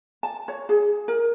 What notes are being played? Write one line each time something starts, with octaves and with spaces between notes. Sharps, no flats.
A5
C#5
G#4
A#4